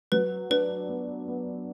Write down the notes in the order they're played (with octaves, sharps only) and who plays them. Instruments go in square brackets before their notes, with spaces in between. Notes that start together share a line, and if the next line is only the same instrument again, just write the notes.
[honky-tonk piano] F#3 [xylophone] B4
[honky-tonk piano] D4 [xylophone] B4
[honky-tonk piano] B3
B3